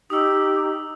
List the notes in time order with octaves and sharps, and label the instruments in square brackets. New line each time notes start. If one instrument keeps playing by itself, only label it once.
[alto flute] D#4 [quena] G4 [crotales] D#6 E6